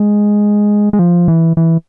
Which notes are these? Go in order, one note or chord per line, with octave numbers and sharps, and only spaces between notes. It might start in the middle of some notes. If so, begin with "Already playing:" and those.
Already playing: G#3
G#3
F3
E3
E3